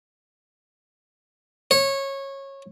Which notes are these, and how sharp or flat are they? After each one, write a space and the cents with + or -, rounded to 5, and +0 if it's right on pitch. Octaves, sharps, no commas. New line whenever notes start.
C#5 -20